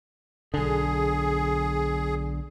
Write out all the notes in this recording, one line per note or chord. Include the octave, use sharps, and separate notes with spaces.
B1 D3 G#4